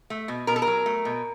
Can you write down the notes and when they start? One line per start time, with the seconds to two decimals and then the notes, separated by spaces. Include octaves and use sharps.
0.10 A3
0.28 B2
0.47 B2 A#4
0.56 A4
0.62 A#4
0.67 F#3
0.86 A3
1.05 B2